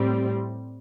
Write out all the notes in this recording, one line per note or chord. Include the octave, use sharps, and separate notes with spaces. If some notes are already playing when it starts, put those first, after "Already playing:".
Already playing: A2 G3 C4